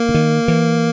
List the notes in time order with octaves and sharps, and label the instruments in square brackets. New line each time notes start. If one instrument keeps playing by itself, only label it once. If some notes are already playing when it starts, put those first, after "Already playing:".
Already playing: [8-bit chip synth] A#3
[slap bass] D3
D#3
E3